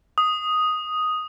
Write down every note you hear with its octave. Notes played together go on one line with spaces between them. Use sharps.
D#6